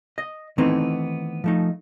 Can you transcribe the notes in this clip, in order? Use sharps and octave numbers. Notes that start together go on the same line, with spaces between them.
D#5
D#3 E3 A3 B3 C4 D#4
F3 A3 D#4